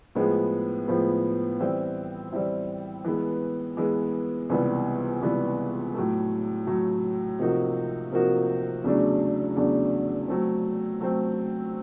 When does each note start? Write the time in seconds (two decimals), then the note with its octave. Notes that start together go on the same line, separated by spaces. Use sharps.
0.15 A2 F3 G#3 B3
0.88 A2 F3 G#3 B3
1.60 E3 G3 C4 E4
2.33 E3 G3 C4 E4
3.04 E3 G#3 B3
3.77 E3 G#3 B3
4.50 C#2 C3 E3 G3 B3
5.22 C#2 C3 E3 G3 B3
5.94 A2 F#3 A3
6.67 A2 F#3 A3
7.39 C3 F3 A#3 D#4 F#4
8.12 C3 F3 A#3 D#4 F#4
8.84 E2 C#3 F#3 A3 D4
9.56 E2 C#3 F#3 A3 D4
10.28 F#3 A3 C4
11.00 F#3 A3 C4